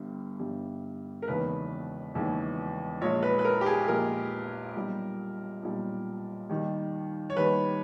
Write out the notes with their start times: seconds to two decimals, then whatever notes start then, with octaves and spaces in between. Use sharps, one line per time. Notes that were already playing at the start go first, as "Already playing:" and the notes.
Already playing: G1 G2 G3
0.39 G1 G2 G3
1.22 A#4
1.28 E1 D#2 C#3 E3 B4
2.14 E1 D#2 C#3 E3
3.01 A#1 A#2 G#3 C#5
3.23 B4
3.39 B4
3.45 A#4
3.61 G4
3.66 G#4
3.88 A#1 A#2 G#3 A#4
4.76 B1 A#2 G3
5.63 B1 A#2 G3
6.50 D#2 D#3 G3
7.30 C#5
7.37 D#2 D#3 G3 B4